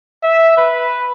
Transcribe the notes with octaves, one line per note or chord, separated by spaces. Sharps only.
E5
B4